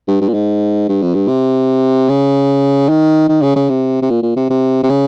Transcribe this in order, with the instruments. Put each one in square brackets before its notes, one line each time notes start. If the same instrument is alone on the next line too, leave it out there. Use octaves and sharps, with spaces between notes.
[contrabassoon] G2
G2
A#2
G#2
G2
F2
G2
C3
C#3
D#3
D#3
C#3
C#3
C3
C3
A#2
A#2
C3
C3
C3
C#3